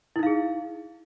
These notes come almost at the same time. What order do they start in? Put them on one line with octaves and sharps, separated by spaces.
E4 D#4 F5 G#4